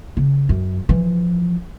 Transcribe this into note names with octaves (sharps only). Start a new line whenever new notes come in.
C#3
F#2
E3 F3